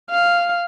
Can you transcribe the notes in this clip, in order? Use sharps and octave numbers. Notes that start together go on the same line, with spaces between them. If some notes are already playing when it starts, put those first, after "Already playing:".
F5